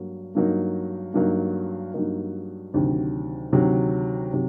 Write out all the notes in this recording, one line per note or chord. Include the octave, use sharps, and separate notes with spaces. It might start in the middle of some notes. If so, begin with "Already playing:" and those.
Already playing: G2 F#3 A#3
G2 F#3 A#3 D#4
G2 F#3 A#3 D#4
G2 F#3 A#3 D#4
D2 C3 D#3 F#3
D2 C3 D#3 F#3
C3 D#3 F#3